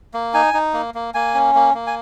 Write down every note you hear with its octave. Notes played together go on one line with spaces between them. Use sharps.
A#3
D#4 G#5
D#4
A#3
A#3
A#3 G#5
C#4
A#3
A#3
G#5